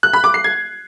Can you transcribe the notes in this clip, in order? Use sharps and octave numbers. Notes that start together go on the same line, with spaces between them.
F#6
B5
D6
C7
G#6